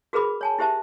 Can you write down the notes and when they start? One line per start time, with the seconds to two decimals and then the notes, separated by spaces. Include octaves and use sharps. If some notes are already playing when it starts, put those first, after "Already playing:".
0.13 F#4 G#4 A#4 B4 B5 D6
0.41 C#5 G#5 A5
0.59 E4 G4 C5 E5 A5